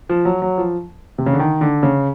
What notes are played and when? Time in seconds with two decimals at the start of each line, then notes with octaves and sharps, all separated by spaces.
0.09 F3
0.25 F#3
0.42 F#3
0.58 F3
1.18 C3
1.26 C#3
1.33 D3
1.39 D#3
1.61 D3
1.83 C#3